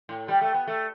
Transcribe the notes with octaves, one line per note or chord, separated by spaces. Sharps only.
A2
G3
A3
B3
A3